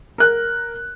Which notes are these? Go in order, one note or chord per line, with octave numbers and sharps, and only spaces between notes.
A#4 F#6